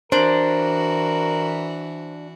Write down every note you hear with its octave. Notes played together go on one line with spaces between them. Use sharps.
E3 D4 F#4 A#4 C5